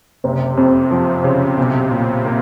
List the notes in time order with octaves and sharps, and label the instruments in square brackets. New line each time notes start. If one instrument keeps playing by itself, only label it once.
[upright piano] F#1 [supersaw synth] C3
[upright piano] F2
F3
C#3
[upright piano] B1 [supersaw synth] C3
[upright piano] A#2
A#3